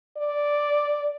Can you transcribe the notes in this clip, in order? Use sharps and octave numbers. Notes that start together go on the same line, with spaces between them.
D5